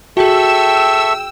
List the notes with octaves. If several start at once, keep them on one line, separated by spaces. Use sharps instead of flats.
F#4 G#4 A4 E5 G5 C#6 E6